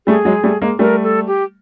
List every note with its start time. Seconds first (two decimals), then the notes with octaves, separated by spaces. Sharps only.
0.07 G3 A3 G#4
0.25 F#3 G#3
0.44 G3 A3
0.62 G#3 A#3
0.79 G3 A3 A#4
1.03 A4
1.27 G4